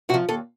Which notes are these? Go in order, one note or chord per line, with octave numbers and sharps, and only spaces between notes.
C3 F3 F#4
D#2 A4